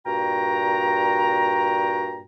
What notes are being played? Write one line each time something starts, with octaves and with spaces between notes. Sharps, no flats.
G2 A#2 F#4 G5 A#5